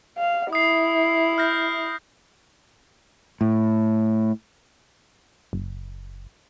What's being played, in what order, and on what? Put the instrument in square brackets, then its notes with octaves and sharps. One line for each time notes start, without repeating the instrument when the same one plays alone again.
[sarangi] F5
[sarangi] E4 [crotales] D#6 C7
[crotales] F6 G6 A#6
[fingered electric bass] A2
[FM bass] F#1